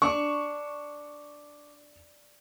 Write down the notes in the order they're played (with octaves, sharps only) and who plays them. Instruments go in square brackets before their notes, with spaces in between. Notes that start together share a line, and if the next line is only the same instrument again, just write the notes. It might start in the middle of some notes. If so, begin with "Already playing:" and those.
[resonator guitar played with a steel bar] D4 [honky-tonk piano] C#6